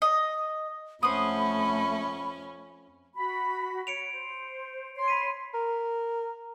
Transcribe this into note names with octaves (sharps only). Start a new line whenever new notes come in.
D#5
F2 A3 C#4 C5 F#5 B5 D#6
F#4 B5
C#5 C#7 D7 F7
C5
C#5 C6
B5 B6 D#7
A#4